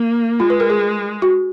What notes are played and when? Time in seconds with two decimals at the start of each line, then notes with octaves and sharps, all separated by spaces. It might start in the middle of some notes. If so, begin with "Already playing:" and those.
Already playing: A#3
0.40 G#3 F4
0.50 B4
0.60 A#4
0.70 G#4
1.22 F#4